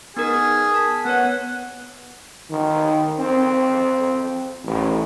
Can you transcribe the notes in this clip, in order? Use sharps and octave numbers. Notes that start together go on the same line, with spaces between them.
B3 D#4 G#4 A#4
A5 B6
B3 B4 C#5 F#5
D#3
C4
A1